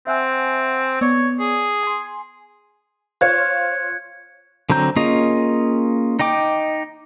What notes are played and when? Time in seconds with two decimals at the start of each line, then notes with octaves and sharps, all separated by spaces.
0.07 C4 E5 F#5 G#5
1.01 B3 C#5 D5
1.40 G#4
1.83 G#5 C6
3.21 F4 C5 C#5 F#6 G#6 C#7
4.69 D3 F#3 C4 A#5 G6
4.96 A#3 C#4 F4 G#4 D#5
6.19 D#4 D#5 G5 D6